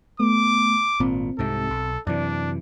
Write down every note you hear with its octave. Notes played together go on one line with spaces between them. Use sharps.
A3 B3 D6
G#1 A#2 C4
C2 G#2 C3 A4
B1
F#2 C3 E3 D4 D5